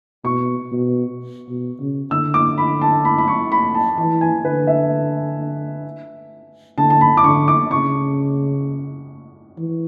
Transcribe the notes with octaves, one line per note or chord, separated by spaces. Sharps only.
B2 C#6
B2
B2
C#3
D3 E6
D6
B5
A5
B5
B5
C#6
B5
A5
E3 A5
G#5
D3 B4
E5
D3 A5
A5
B5
D6
D3 C#6
D6
C#3 C#6
E3